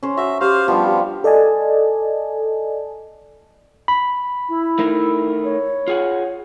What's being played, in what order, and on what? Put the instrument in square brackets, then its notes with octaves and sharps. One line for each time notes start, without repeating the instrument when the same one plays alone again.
[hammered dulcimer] C#4 C5
[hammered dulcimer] F#4 C5 A#5 [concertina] E5
[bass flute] G4 [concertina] C5 F5 [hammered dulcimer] C6 C#6
[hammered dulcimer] F3 G3 D4 [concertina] B3
[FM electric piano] A4 D5 D#5 G#5 A5
[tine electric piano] B5
[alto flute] E4
[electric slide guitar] A3 D#4 A#4
[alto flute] C#5
[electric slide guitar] F4 G#4 F#5